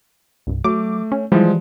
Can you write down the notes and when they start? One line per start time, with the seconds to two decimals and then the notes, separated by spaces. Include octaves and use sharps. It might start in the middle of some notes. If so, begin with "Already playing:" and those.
0.47 C2 G2
0.64 F#3 A3 D6
1.12 C#4
1.32 E3 F3 G3 G#3